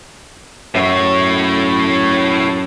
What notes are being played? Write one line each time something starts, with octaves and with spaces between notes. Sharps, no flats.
F#2 A2 C#5